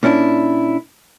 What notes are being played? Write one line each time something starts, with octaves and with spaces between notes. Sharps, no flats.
A#2 C#4 D4 E4